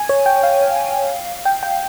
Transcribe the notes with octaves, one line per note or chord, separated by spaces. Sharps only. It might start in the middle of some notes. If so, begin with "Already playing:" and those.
Already playing: G#5
C#5
G5
F5
G5
G5